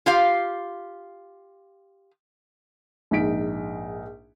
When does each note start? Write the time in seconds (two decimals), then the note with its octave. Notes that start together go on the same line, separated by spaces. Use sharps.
0.06 F4 G4 F5
3.11 A#1 G#2 D#4 B6 D7